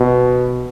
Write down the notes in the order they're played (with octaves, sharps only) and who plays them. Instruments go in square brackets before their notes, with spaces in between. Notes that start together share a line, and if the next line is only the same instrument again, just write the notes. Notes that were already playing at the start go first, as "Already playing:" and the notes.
Already playing: [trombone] B2